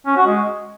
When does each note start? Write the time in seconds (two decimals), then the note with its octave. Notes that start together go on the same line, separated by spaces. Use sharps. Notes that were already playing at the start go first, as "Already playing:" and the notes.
0.06 C#4
0.16 F#4
0.26 G#3